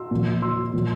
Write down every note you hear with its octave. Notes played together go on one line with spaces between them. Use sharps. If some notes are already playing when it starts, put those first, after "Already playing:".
Already playing: C6 E6
A#2 F3
C6 E6
A#2 F3